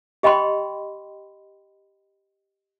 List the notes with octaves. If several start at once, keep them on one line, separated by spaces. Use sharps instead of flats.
G4 D#5 G5 B5 C6